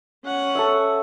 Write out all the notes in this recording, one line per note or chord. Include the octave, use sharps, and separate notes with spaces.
C#4 F#5
A4 C#5 E5